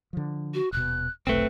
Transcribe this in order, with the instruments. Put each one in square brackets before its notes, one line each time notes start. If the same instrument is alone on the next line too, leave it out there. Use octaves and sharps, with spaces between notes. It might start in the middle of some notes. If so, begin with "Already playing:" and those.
[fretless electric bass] D3 F3
[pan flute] F#4
[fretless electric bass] D#1 B2 [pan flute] F#6
[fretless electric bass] F1 B1 [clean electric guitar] A3 C4 [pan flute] B4